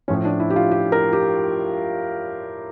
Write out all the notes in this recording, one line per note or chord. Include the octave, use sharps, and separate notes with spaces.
A2 F3 C#4
D4
E4
G4
F4
G4
A#4
G4